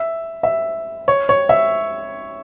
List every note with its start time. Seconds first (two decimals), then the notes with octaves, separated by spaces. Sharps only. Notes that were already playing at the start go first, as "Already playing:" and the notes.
Already playing: E5
0.43 E5
1.08 C#5
1.29 C#5
1.49 E5